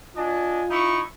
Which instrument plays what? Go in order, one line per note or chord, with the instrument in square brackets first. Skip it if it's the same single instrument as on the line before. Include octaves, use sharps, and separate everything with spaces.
[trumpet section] D4 D#5 G#5 [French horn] F4
[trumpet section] D#4 E4 C#6